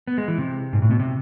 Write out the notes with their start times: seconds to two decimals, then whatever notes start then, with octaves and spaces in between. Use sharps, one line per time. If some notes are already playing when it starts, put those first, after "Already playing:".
0.07 B3
0.18 G#3
0.28 E3
0.38 C3
0.73 G#2
0.82 A2
0.91 B2
1.00 C3